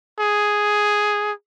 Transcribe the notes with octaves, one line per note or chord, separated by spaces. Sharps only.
G#4